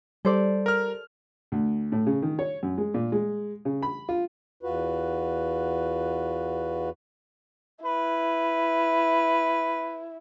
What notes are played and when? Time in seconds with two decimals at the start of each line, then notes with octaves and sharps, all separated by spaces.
0.25 G3 A4 C5 D5
0.66 A#4 F6
1.52 D2
1.92 A2
2.07 C#3
2.22 D#3
2.39 C#5
2.63 F#2
2.78 G#3
2.94 A#2
3.12 G#3
3.65 C#3
3.83 B5
4.09 F4
4.63 E2 F4 F#4 B4
7.85 E4 B4